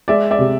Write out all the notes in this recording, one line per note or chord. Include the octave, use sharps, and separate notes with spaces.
G#3 D5 E5
D5 E5
C3